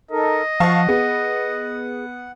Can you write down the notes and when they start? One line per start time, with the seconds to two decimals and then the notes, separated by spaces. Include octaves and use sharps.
0.11 D#4 A4 A#4 D#5
0.60 F3 F5 F#5 A5 C#6
0.89 B3 G#4